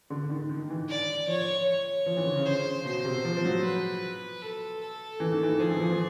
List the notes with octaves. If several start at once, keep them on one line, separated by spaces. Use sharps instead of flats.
D3
D#3
D#3
E3
D5
F3 C#5
C#5
F3
E3
D3
C#3
C5
B2 C5
C3
F3
F3
F#3
B4
A4
A4
E3
D#3
E3
F3 G#4
E3
F3
E3